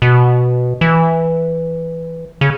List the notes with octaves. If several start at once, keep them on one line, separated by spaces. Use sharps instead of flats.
B2
E3
C#3